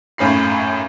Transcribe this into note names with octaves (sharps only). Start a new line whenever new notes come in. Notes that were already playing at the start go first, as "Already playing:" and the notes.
G#1 F#2 A2 C#4 B5 C7